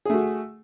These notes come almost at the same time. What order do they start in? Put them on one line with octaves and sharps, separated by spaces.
G#4 A3 F#4